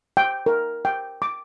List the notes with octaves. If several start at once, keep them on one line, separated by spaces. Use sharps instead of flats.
G5
A#4
G5
D6